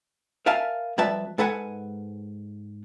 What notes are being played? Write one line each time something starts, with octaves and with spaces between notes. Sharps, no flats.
A#4 E5 F5 G#5 A5
F2 G3 B4 E5 A5
G#2 A4 B4 F#5 G#5